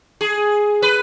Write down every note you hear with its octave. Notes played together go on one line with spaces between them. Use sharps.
G#4
B4